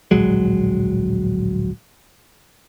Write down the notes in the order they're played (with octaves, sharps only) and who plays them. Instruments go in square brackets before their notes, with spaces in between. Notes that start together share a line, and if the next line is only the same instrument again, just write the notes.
[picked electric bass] D1 A#1 F#3 G#3